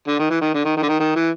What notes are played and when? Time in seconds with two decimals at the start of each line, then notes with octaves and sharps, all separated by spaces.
0.08 D3
0.19 D#3
0.30 E3
0.41 D#3
0.54 D3
0.65 D#3
0.77 D#3
0.83 D3
0.89 D#3
1.00 D#3
1.15 E3